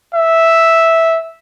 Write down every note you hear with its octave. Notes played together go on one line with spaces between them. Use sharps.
E5